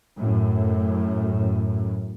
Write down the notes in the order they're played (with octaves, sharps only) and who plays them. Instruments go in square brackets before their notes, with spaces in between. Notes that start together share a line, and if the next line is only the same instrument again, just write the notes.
[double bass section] F#2 A2